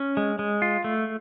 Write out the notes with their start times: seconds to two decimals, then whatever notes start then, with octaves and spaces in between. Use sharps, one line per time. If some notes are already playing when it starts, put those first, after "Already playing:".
Already playing: C#4
0.17 G#3
0.39 G#3
0.62 F4
0.84 A3